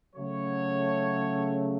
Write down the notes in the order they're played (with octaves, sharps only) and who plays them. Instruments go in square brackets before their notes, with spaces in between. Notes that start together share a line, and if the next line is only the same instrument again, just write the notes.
[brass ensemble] C#3 F#3 A3 C#5